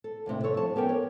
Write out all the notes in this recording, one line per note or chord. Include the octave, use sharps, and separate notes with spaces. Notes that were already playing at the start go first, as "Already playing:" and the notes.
A4
D#2 A2 C3 D4
A4 C#5
F3 A5
B3 C#4 G4 A4 A#4 G5
C#5